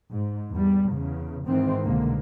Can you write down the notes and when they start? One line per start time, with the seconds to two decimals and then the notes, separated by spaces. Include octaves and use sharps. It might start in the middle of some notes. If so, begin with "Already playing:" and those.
0.11 G#2
0.52 E2 G3
0.92 E2 C#3
1.48 G#2 D#3 E3 C4
1.84 C2 G#2 B2 D3 A#3